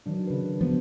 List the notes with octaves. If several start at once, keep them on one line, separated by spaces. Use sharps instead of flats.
D#3 F#3 D4
C#3 D4 B4
F3 B3